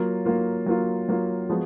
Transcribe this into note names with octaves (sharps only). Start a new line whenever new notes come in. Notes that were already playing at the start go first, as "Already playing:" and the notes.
Already playing: F#3 A#3 F4
F#3 A#3 F4
F#3 A#3 F4
F#3 A#3 F4
F3 G#3 B3 F#4